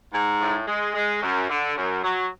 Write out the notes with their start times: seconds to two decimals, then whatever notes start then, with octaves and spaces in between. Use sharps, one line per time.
0.13 G#2
0.41 A2
0.68 G#3
0.95 G#3
1.23 F#2
1.50 D3
1.77 F#2
2.04 F#3